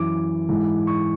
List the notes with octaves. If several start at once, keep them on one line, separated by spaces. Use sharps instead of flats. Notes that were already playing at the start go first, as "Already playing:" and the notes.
Already playing: F#2 E3 D6
G#2 E3
C#6